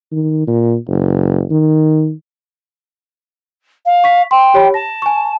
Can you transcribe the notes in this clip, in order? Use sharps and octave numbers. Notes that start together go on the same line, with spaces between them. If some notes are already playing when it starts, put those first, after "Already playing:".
D#3
A#2
F#1
D#3
F5
C#6 B6
G5 C6
G4 C#5 B5
A5 A#6
G#5 C#6